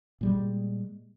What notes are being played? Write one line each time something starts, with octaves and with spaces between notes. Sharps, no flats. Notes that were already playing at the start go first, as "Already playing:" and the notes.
A#2 G3 G#3